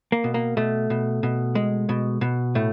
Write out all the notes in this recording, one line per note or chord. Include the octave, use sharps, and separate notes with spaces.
A#3
B2
A#3
B2 A3
B2
B2
G#3
B2
B2
A2 A3